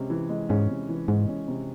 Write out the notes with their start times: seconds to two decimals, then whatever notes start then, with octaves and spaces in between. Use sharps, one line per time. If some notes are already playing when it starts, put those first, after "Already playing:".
Already playing: C3 G#3 C#4
0.10 E3
0.29 G#3
0.49 G#2 C#4
0.69 C3
0.89 E3
1.08 G#2 G#3
1.28 C#4
1.48 C3